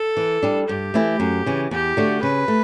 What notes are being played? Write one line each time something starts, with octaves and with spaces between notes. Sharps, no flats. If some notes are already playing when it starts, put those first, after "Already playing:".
Already playing: A4
E3
G3 D4
G2 G4
E3 A3 E4
F#2
C#3 E3
E2 G4
D3 A3 D4 F#4
C#3 B4
A3